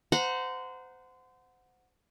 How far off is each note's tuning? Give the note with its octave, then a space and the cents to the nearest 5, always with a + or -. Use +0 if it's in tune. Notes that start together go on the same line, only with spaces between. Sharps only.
C5 -25 F#5 -10 A#5 +0